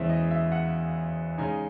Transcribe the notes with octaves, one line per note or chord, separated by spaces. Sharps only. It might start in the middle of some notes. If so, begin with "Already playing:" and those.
Already playing: E2 C#3 E3 G#3 C4 E5
D#5
E5
F#5
C#3 G#3 D#4 G#5